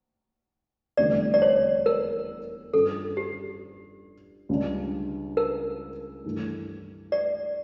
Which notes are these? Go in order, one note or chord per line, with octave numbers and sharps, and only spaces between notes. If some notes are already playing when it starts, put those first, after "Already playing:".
F1 E2 D3 G3 C#4 D5
D5
C#5
A#4
G2 F3 C#4 A4
G4
C#2 C#3 G3 D4
A#4
G2 E3 A3
D5